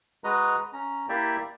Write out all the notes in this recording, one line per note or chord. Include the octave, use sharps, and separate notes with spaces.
G#3 F#4 B4 D#5 A#5
C#4 A#5
A#3 E4 G4 D5 E5 G5